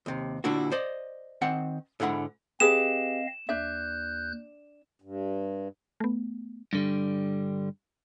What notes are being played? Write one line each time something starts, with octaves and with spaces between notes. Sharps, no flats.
D#2 C3
A#2 D3 D4 E4 F#4
C5 D5 D#5
D#3 C4 F#5
G#2 D3 E4 F#5 B5
C4 G4 G#4 B4 D#5 F5 E7
D#2 D4 E5 F#6 G6
G2
A3 B3
G2 D3 G3